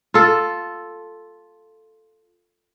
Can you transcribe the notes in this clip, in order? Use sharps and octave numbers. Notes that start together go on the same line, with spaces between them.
F4 A4